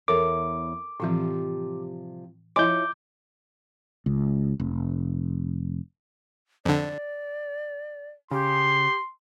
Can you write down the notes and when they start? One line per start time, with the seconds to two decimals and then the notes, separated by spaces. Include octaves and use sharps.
0.08 E2 A4 A#4 C#5 D6
1.00 A2 C3 E3 F3 G3
2.56 F3 E4 C#5 D#5 G#5 C6 D6 G6
4.06 C#2
4.60 F1
6.65 F2 D3 D5
8.31 C#3 G4 C6